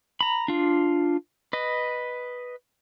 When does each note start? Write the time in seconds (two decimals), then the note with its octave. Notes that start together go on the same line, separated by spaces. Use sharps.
0.21 A#5 B5
0.48 D4 F4
1.53 B4 D#5